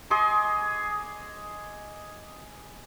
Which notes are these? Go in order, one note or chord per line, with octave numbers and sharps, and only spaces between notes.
G#4 D#5 C6 D6